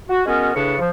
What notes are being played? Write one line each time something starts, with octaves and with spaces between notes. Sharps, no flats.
F#4
G#3 B3 C#4 F#4 A#4
A2 C#3 D4 B4 C#6
F3